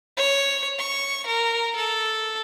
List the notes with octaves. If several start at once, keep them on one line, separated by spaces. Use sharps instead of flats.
C#5
C#6
A#4
A4